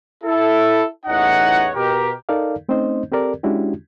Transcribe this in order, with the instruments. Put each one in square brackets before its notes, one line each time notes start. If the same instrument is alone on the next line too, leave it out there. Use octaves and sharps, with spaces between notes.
[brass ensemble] E4 A4
A1 E2 D#4 C#5 D#5 F#5
B2 G4 A#4
[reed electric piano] D#4 A4 A#4 D5 F5
A3 C4 C#4 D#4 C5 D#5
C4 G4 A4 A#4 D5
G#3 C#4 D4 E4 F#4 G4